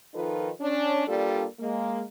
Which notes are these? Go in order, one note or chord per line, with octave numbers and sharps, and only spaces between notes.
D#3 F3 D#4 F4 A4 B4
C#4 D4
G3 A#3 D4 F4 G4 A4
G#3 A#3